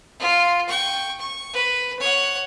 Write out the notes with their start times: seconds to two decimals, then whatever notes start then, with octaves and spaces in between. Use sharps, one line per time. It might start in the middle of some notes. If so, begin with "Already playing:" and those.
0.20 F4
0.68 G5 C#6
1.19 C#6
1.53 B4
1.99 C#5 F#5